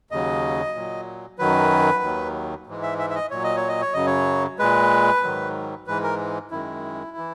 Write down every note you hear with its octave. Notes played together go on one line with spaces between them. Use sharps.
D#2 C#3 F#3 D#5
A#2 F#3
F#2 D#3 F#3 B4
D#2 D#3 F#3
G#2 E3 G#3
E5
E5
E5
D#5
A#2 F#3 C#5
D#5
C#5
D#5
C#5
F#2 C#3 F#3 D#5
C#5
A#2 G#3 B4
G#2 D#3 F#3
G#2 E3 G#3 B4
A#4
F#2 D#3 G#3 E4
E3